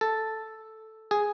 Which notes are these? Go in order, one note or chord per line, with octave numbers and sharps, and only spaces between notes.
A4
G#4